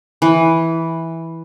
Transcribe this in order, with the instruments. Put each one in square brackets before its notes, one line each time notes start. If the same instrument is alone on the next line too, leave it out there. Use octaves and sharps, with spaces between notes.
[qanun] E3